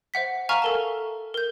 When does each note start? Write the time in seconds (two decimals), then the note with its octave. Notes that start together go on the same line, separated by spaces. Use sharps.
0.14 C5 E5 F#5 B6
0.49 E5 F5 G#5 A#5 C#6 F6
0.62 A4 A#4 A5
1.34 A#4 G6